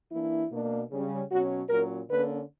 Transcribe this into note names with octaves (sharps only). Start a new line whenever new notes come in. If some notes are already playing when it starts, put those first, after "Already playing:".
E3 A#3 D4 E4
B2 A#3 D4
C#3 G3 C#4
B2 F#3 C#4 F#4
A#2 F#3 C#4 A#4
D3 A#3 C#4 B4